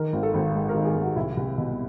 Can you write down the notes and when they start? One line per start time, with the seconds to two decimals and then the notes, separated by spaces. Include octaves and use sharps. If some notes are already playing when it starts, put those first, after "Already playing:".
Already playing: D#3 A#4
0.13 G#1
0.23 A4
0.34 G#1
0.55 G#2
0.69 A#4
0.74 D#3
0.85 G#4
0.95 G#1
1.01 F#4
1.16 C2 E4
1.37 C2
1.58 B2